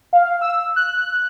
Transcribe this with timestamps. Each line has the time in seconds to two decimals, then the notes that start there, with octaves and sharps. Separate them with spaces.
0.13 F5
0.41 E6
0.76 F#6